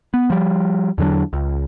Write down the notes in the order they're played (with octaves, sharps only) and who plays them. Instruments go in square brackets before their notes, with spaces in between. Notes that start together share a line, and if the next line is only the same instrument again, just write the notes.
[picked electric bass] B3
F3 G3
E2 D3 F#3 D4
C#2